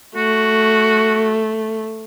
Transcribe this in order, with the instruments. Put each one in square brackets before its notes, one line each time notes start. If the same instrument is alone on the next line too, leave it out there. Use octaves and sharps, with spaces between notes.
[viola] A3 [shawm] F#4